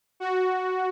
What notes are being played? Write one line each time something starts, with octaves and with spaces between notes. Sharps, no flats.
F#4